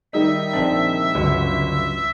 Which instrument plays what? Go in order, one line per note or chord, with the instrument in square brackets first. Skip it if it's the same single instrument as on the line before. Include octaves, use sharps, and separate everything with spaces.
[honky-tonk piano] D#3 G3 D#4 [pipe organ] E5 E6
[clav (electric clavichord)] A#1 C4 D4
[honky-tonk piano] G1 [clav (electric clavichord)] C#2 F#3